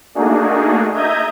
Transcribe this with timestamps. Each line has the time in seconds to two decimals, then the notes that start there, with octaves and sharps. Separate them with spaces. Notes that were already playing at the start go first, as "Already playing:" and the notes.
0.15 A3 A#3 D4 D#4 F#4 G#4
0.94 D#5 E5 A#5 D#6 G6 G#6